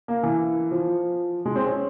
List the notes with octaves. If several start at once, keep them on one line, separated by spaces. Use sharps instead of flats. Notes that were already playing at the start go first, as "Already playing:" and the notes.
A#3
E3
F3
G#3
C4
C#4